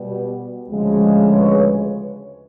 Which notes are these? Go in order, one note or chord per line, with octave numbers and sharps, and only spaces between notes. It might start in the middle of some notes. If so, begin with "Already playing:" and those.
Already playing: B2 G3 B3
D2 C#3 F3 G#3
B4 C#5